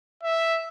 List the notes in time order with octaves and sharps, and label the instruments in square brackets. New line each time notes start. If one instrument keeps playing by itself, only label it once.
[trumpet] E5